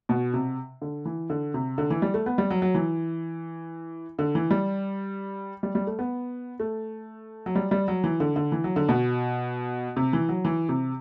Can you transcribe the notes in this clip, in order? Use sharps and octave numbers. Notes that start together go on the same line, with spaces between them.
B2
C3
D3
E3
D3
C3
D3
E3
G3
A3
B3
G3
F#3
F#3
E3
D3
E3
G3
G3
G3
A3
B3
A3
F#3
G3
G3
F#3
E3
D3
D3
E3
F#3
D3
B2
C3
E3
F#3
E3
C3